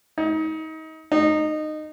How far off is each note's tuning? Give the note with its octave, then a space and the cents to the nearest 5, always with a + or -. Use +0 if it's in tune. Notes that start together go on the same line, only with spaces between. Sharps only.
D#4 +30
D#4 -20